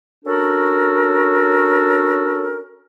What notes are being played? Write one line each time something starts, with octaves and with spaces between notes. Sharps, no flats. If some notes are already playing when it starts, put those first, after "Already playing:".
C#4 D4 F#4 A4 A#4